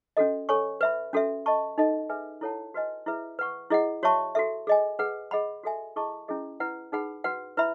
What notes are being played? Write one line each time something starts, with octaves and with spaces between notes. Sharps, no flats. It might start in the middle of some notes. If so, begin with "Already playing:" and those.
C#4 F#4 A4 D#5
A4 C#5 G#5 C#6
B4 E5 B5
C#4 F#4 A4 E5
A4 D#5 A5 C#6
D#4 A4 D#5
G#4 B4 E5 G#5
E4 A4 C#5 F#5 A5
F#4 B4 D#5 G#5
E4 G#4 B4 E5
B4 F#5 C#6
E4 G#4 D#5 F#5
F#4 C#5 E5 A5 C#6
F#4 A4 E5
G#4 D#5 G#5
G#4 B4 F#5
G#4 D#5 F#5 B5
F#4 A4 E5 G#5
E4 G#4 D#5 A5 C#6
C#4 E4 G#4 D#5
E4 B4 F#5
D#4 G#4 B4 F#5 B5
F#4 B4 F#5
E4 B4 E5 B5